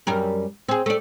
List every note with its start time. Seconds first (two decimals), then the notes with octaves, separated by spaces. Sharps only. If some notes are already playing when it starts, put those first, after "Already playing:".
0.07 F#2 G3 A#4
0.69 C4 G#4
0.86 A3 D5